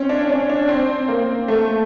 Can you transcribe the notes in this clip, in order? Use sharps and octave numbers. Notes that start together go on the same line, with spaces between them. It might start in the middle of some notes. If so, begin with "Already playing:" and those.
Already playing: C4 C#4
D4
D4
C#4
D4
C4
A#3
A3